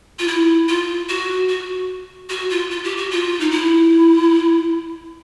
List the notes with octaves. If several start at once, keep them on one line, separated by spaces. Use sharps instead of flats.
F4
E4
F4
F#4
F#4
F#4
F4
F4
G4
F#4
F4
D#4
E4